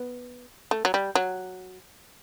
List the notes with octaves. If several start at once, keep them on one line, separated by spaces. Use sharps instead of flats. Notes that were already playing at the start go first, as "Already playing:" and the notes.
Already playing: B3
A3
F#3
G3
F#3